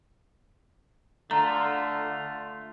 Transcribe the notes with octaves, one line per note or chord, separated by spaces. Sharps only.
D3 A3 F4 A#5